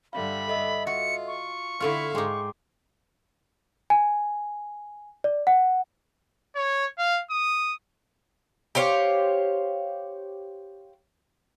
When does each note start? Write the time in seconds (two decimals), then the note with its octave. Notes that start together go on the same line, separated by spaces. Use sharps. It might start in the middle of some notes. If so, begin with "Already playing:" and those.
0.13 G2 D3 G3 E5 F5 B5
0.48 A4 D#5 E5
0.87 F4 F#4 C#7
1.27 C#6
1.81 D3 A3 E4 F4 E5 F5 C6 F6
2.15 G#2 G#3 D#4 G5 C6 D6
3.90 G#5
5.24 D5
5.47 F#5
6.56 C#5
6.98 F5
7.31 D#6
8.75 G4 C5 C#5 F5